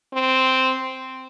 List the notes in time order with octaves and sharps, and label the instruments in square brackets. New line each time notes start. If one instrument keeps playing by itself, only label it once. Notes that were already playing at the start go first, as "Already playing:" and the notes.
[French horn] C4